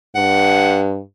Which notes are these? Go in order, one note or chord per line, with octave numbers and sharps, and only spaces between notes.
G2 F#5